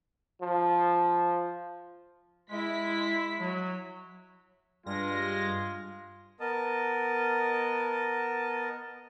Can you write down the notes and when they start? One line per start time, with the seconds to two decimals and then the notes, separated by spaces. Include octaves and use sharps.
0.41 F3
2.51 G#3 E4 B6
3.40 F#3
4.86 G2 G#3 F4 A#6
6.40 B3 A#4 D#5 A5